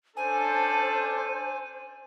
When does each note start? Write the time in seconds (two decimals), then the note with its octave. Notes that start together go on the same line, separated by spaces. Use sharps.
0.17 C#4 D4 A4 C5 G#5